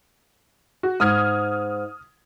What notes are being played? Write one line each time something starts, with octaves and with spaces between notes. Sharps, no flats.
F#4
G#2 D#6 F6 G#6